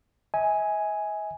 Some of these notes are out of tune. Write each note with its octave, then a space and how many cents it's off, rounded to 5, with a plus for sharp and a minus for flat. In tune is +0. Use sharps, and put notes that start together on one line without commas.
E5 -45 G#5 +0